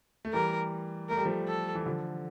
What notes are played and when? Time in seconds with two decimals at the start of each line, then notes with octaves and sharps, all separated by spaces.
0.25 A3
0.33 E3 G3 A#4
1.09 A3 A#4
1.17 G3
1.25 F3 A3
1.48 A4
1.75 E3
1.86 D3 F3